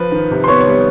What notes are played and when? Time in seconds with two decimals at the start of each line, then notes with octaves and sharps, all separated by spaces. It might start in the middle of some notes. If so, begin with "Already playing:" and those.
Already playing: F3 B4
0.12 D#3
0.31 C3
0.44 C6
0.48 B3 C#5 C#6
0.61 C#5 C#6
0.67 G3